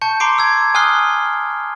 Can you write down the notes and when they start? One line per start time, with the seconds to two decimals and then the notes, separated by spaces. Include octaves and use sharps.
0.02 A5 C#6 G6 C#7
0.20 A#5 C6 D6 C7 D7
0.38 E6 G#6
0.75 G#5 D#6 F6 F#6 C7 G7